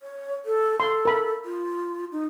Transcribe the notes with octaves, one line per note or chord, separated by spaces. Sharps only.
C#5
A4
A4 C6
A#4 B5
F4
D#4